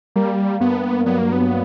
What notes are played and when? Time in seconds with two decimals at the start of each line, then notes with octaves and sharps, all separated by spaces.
0.16 G3 A#3
0.60 G2 B3
1.06 F#3 B3
1.18 A#3
1.32 B3